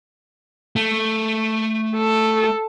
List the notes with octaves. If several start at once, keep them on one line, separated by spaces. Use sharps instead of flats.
A3
A4